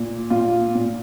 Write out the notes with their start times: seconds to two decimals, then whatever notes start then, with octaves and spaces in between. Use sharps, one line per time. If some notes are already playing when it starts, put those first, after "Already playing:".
Already playing: A#2
0.30 A#2 F4
0.75 A#2